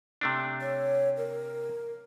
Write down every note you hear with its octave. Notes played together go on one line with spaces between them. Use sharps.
C3 A3 D4
C#5
A#4